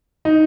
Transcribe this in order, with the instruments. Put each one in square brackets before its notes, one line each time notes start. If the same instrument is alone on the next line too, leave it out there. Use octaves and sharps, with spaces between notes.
[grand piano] D#4